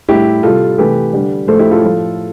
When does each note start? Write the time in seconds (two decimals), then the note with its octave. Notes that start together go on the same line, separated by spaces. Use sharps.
0.08 A2 G3 E4 G4
0.43 C3 G3 F4 A4
0.78 C3 E3 A3 G4 B4
1.13 D3 G3
1.48 A2 F3 A3 A4 C5
1.59 E4 G4
1.71 F4 A4
1.83 A2 F3 A3